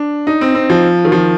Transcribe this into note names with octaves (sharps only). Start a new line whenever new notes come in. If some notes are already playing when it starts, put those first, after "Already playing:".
Already playing: D4
D#4
C4
C4
F3
D#3
F3